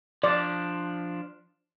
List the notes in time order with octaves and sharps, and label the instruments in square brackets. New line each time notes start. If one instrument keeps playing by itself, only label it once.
[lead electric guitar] F3 D4 [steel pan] D5